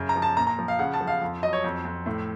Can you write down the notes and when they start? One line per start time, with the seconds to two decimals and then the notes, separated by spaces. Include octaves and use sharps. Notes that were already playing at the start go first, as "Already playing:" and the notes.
Already playing: F#2 C#3
0.09 A#5
0.16 F3
0.22 A5
0.37 A#2 A#5
0.47 A#5
0.59 F3
0.68 F5
0.79 C#3 F#5
0.93 A5
1.01 F3
1.07 F5
1.22 F2
1.43 F#3 D#5
1.53 C#5
1.64 F2
1.85 F2
2.06 A2